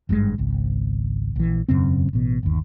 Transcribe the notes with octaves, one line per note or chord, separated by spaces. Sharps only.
G#1 G2 C3 G#3
G#1 C#2
A#1 E3
E1 F#2 C#3 C4
A1 B2
G1 D#2